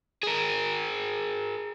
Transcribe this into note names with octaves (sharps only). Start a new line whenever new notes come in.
G#4 A#4